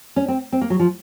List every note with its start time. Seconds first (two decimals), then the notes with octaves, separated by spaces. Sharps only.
0.16 C#4
0.28 C4
0.52 C4
0.61 A#3
0.70 F#3
0.79 F3